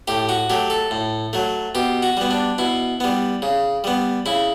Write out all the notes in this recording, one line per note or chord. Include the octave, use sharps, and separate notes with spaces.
A2 G4
F#4
F#3 A3 G4
A4
A2
F#3 A3
B2 G4
F#4
G3 B3
D4
B2 E4
G3 B3
C#3
G3 B3
C#3 E4